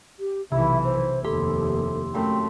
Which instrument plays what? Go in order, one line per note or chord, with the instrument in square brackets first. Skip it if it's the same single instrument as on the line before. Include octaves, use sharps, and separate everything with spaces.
[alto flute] G4
[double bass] B1 E3 [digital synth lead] C3 [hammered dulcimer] E4 [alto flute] E5
[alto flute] C5
[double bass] F1 D#2 [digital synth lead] G4 [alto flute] A4 [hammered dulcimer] C6
[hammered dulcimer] F#2 C4 C6 [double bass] A3 [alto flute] G5